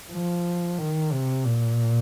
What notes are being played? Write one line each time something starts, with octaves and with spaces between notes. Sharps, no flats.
F3
D#3
C3
A#2